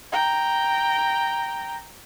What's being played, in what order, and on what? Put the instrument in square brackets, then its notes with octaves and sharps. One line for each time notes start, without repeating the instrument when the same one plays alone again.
[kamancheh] G5 A#5